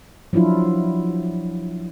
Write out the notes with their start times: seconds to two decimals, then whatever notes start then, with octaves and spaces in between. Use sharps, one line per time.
0.33 F3 F#3 D4 E4 F4